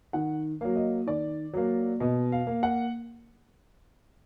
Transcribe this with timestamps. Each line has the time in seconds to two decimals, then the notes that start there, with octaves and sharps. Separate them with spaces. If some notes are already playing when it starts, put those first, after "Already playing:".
0.13 D#3 F#5
0.61 F#3 A#3
0.76 D#5
1.07 D#3 D5
1.53 F#3 A#3
2.00 B2 D#5
2.32 F5
2.47 A#3
2.63 F#5